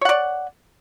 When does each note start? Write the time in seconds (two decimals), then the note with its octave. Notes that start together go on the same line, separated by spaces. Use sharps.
0.01 C#5
0.05 F#5
0.09 D5